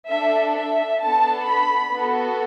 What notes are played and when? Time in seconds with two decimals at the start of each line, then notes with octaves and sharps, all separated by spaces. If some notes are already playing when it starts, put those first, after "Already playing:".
0.11 D4 A4 E5
0.57 E5
1.02 B3 D4 A4 A5
1.49 B5
1.94 B3 F#4 A4